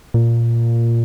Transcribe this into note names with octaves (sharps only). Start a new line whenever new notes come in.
A#2